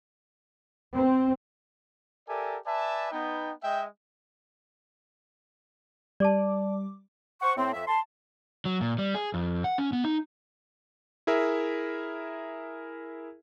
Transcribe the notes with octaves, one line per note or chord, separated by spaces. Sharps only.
C4
G4 A4 A#4 D5 E5 G#5
B4 D5 E5 G#5 A5
B3 D#4 G5
G#3 D#5 E5 G5
G3 D5 A5 D6
C5 F#5 C#6
A2 C4
F2 E5
A5 C6
F#3
A#2
G3
G#4
F2
F#5
C#4
B3
D#4
E4 G#4 A#4 E5